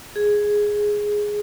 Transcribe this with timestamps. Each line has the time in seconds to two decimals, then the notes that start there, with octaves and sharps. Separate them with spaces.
0.16 G#4